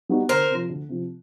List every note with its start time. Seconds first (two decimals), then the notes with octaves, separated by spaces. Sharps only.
0.09 G3 B3 D#4 F#4
0.29 D2 A#4 C5
0.50 C3 F3
0.69 D2
0.89 C3 F3